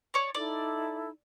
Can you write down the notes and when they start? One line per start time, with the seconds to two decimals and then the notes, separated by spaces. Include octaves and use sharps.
0.14 C#5 D5
0.35 D#4 E4 A4 D5